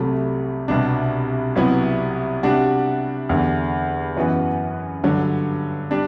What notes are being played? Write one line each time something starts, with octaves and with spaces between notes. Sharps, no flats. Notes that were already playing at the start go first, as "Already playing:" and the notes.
Already playing: C2 C3 F#3 A3
C2 B2 G3 D4
C2 C3 F#3 B3 E4
C3 G3 D4 F#4
E2 D3 G3
F#2 E3 B3 F#4
G2 D3 F#3
G3 D4